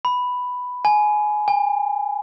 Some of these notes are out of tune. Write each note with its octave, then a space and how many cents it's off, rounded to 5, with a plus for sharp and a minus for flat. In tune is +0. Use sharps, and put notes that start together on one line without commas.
B5 +5
G#5 +20
G#5 -45